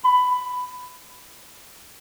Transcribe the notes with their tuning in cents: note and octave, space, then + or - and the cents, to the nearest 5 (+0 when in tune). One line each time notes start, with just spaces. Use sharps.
B5 +15